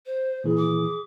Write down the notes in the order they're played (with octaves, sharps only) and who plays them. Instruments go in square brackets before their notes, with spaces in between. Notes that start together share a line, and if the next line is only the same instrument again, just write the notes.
[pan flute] C5
[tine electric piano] A#2 E3 [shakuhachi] G#4
[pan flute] D6